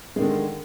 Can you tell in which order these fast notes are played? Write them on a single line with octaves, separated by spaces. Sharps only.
G#3 D#3 D3